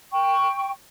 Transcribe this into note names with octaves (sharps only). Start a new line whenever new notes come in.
G5 C#6